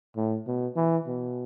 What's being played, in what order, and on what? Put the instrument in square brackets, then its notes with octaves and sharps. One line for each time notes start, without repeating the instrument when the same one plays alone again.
[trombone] A2
B2
E3
B2